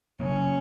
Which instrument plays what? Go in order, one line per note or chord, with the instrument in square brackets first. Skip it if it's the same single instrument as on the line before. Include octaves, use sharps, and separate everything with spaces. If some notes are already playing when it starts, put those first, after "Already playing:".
[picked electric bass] C#3 F#3 A#3 [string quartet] C#4